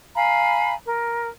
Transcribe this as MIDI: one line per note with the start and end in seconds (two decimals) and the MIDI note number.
0.15 0.74 77
0.15 0.74 80
0.15 0.74 82
0.15 0.74 83
0.86 1.28 70